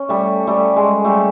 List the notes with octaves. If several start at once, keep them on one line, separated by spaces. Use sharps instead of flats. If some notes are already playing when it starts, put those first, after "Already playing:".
Already playing: C#4
G3 A3
G3 A3
G#3
G3 A3